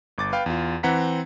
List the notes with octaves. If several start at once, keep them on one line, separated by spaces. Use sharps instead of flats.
G1 D6 A6
B4 F5 G5
E2 F4
E3 C4 F#5 A#5 B6